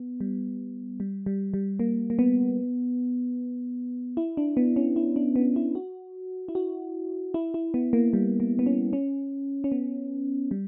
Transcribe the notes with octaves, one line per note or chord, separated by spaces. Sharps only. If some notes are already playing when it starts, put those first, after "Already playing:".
Already playing: B3
G3
G3
G3
G3
A#3
A#3
B3
E4
D4
B3
C#4
E4
D4
B3
E4
F#4
E4
F#4
E4
E4
B3
A#3
G3
A#3
B3
C#4
C#4
C#4
B3
G3